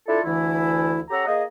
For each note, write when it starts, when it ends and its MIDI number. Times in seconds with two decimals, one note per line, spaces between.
0.07 0.20 62
0.07 0.20 64
0.07 0.20 65
0.07 0.20 69
0.25 1.01 38
0.25 1.01 52
0.25 1.01 64
1.10 1.27 61
1.10 1.27 67
1.10 1.27 69
1.10 1.27 78
1.10 1.27 82
1.27 1.43 58
1.27 1.43 68
1.27 1.43 75